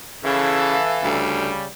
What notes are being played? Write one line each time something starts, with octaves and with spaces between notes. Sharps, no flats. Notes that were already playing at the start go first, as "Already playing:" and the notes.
C#3 E3 A4 F5
D2 C#3 G3